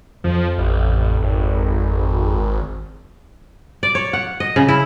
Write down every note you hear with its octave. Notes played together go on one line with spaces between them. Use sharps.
F2 F3
A1
G#1
D5
C#5
F#5
D#5
C#3
E4